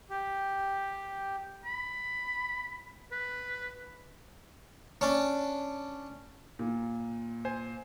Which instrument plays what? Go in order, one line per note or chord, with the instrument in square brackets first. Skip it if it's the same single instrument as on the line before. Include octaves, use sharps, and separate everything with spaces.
[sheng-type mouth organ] G4
[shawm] B5
B4
[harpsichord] C#4 D4
[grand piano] A#2
[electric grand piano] C5 G#5